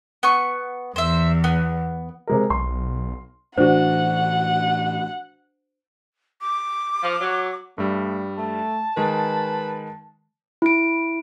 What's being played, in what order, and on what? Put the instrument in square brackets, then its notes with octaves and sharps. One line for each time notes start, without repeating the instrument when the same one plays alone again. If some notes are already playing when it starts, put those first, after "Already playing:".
[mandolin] B3 C#6
[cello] E2 [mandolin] C5 E5
[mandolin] B3
[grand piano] C3 G#3 A#4
[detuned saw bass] B1 [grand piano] C6
[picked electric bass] A2 E3 [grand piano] D4 F#4 [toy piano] C5 [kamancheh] F#5
[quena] D6
[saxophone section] F3
F#3
[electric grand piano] G2 G3 [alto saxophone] A3
[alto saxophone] A3 [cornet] A5
[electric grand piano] D#3 G#3 [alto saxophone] B4
[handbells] E4 D7